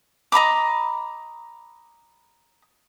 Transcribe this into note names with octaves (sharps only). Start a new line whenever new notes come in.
D#5 A#5 B5 D6